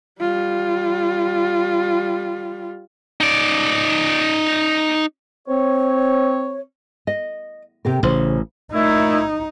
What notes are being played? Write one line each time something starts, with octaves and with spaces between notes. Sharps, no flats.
G3 F4
D#4 D5
C4 C#5
D#5
C3 G4 A#4
A1 C#3 C5
A#2 A3 D#4 E4